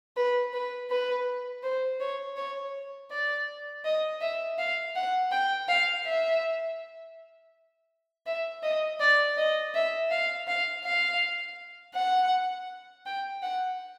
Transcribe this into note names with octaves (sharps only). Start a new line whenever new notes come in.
B4
B4
B4
C5
C#5
C#5
D5
D#5
E5
F5
F#5
G5
F5
E5
E5
D#5
D5
D#5
E5
F5
F5
F5
F#5
G5
F#5